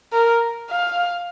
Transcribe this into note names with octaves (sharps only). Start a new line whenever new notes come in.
A#4
F5